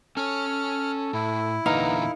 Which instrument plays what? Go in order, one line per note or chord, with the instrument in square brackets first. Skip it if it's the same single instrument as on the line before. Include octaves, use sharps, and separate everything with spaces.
[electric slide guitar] C#4 C#5 [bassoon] A4 [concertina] F6
[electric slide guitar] A2 [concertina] E4
[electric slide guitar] E2 A#2 D3 [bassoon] B3 [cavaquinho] D#4 A#4 F5